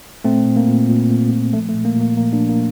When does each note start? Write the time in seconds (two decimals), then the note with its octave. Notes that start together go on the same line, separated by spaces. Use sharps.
0.24 A#2 A3 C4
0.46 A#2
0.56 A#3
0.67 A#2
0.89 A#2
1.10 A#2
1.31 A#2
1.53 F3 A3
1.69 A3
1.74 A#2
1.85 A#3
1.95 A#2
2.01 A#3
2.17 F3 A#3
2.33 A#3 D4
2.38 F3
2.49 A#3